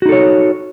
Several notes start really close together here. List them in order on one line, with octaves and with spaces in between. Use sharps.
F#4 D#4 A4 C#5